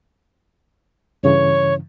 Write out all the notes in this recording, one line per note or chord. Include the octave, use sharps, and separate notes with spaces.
G2 C#3 E3 C#5